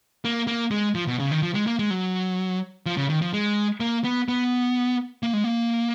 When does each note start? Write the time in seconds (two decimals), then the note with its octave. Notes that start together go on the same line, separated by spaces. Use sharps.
0.25 A#3
0.47 A#3
0.71 G#3
0.95 F3
1.07 B2
1.19 C#3
1.31 D#3
1.42 F3
1.55 G#3
1.67 A#3
1.79 G#3
1.90 F#3
2.86 F3
2.97 C#3
3.10 D#3
3.22 F3
3.33 G#3
3.80 A#3
4.04 B3
4.28 B3
5.23 A#3
5.33 G#3
5.44 A#3